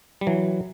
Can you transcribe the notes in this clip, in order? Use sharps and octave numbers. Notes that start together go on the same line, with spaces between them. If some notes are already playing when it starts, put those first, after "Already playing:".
G3
E3 F#3